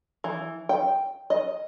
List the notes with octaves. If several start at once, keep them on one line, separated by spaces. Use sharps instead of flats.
E3
G5
D#5